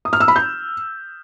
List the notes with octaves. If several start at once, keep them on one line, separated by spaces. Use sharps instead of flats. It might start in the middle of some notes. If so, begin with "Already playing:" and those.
D#6
F6
E6
B5
G6